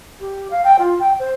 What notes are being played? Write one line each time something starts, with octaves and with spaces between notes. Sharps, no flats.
G4
F5
G5
F4
G5
C5